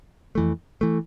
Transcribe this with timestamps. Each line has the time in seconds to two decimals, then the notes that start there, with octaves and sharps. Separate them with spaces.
0.35 F2 E3 A3
0.81 E3 A3